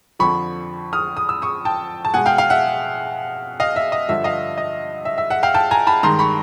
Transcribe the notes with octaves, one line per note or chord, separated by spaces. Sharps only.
F2 D3 F3 B5 C#6
D#6 F6
D#6
E6
C#6 D#6
G5 A5
A5
B2 G#3 F#5 G#5
F5 G5
F5 G5
E5 F#5
D#5 F5
E5
D#5
G2 D3 F3 E5
D#5 F5
D#5
E5
E5
E5 F#5
F5 G5
G5 A5
G#5 A#5
A5 B5
G2 D#3 G#3 A#5 C6
B5 C#6